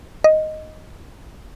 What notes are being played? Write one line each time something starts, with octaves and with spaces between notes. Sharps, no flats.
D#5